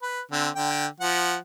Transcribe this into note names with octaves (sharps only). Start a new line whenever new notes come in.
B4
D3 C4
D3 G5
F3 F#5